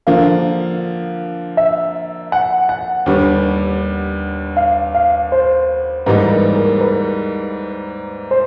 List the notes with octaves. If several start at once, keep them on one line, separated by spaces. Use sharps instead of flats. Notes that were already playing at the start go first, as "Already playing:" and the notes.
D3 F3 A#3 F5
E5
F#5
F#5
D#2 D3 G3 B3
F5
F5
C5
G#2 E3 G3 A#3 D#4 B4
A#4
A#4
B4
C5